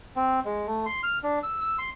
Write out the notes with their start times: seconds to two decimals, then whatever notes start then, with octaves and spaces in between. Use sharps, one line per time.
0.16 C4
0.45 G#3
0.67 A3
0.86 C6
1.03 F6
1.23 D4
1.43 E6
1.61 E6
1.79 C6